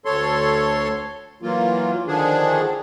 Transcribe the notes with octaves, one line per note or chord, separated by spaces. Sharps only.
D2 A4 C#5 C6
E3 F#3 A#3 F4
D3 D#3 F3 D4 G#4